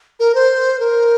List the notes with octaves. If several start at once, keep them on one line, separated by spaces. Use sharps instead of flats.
A#4
C5
A#4